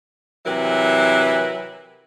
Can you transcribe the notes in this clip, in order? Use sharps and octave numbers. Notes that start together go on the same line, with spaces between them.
C3 E3 F#3 E4 A#4 B4